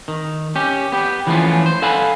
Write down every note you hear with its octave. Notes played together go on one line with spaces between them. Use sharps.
D#3
C#4 G4
B3 G4
E3 F3 A3 B3 C#4 F4
C5
A4 F5 F#5 G#5 B5